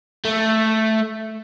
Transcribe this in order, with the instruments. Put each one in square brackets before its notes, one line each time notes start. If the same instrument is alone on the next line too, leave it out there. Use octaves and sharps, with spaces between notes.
[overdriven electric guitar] A3